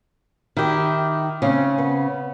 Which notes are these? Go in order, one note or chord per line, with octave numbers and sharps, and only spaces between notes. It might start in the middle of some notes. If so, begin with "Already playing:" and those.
D#3 E4 G4
C#3 C4 C#4
B3